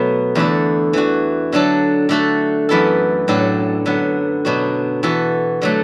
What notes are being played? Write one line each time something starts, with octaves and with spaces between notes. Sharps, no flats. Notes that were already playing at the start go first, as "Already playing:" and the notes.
Already playing: B2 F#3 A3 B3 A4
E2 D3 A3 E4 A4
E3 D4 F#4
D3 F#3 D4 A4
D3 A3 F#4 A4
F#2 E3 B3 E4 A4
A2 F#3 D4 A4
D3 F#3 B3
B2 F#3 D4 F#4
E3 B3 F#4 A4
D3 F#3 A3